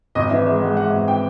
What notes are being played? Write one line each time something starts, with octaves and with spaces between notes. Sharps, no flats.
G#1 D#5
E3 E5
G#3 E5
G#3 F#5
G#3 F#5
G#1 F#5
G5